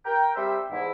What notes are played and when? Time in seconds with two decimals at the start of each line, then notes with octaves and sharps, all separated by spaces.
0.05 A#4 G5
0.36 G3 C4 C5 E5
0.70 E2 G#2 E4